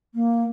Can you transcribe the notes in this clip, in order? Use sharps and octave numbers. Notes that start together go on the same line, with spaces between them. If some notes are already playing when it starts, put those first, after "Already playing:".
A#3